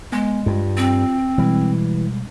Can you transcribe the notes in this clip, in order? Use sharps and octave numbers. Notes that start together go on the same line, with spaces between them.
G#3 B3 G#5
G2 F4
C4
B2 E3 G3 G#3